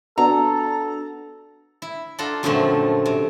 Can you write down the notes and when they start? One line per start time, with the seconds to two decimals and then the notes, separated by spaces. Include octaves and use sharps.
0.18 B3 D4 F#4 A4 A#5
1.82 E4
2.19 D4 F4 A4 F#5 A#5
2.43 F#2 A#2 D3 F3 A3 C4
3.06 C3